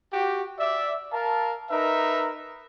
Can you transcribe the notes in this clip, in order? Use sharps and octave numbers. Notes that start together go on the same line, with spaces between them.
F#4 G4
D5 E5
A#4 F5 A5
D#4 A#4 B4 E5